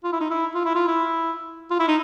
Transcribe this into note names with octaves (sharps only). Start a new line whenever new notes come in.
F4
E4
D#4
E4
F4
E4
F4
E4
F4
E4
D#4